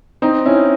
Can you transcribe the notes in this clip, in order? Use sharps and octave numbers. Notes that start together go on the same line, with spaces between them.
C4 D#4
C#4 E4